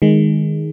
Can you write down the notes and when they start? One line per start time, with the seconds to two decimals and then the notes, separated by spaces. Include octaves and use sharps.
0.02 D#3 G#3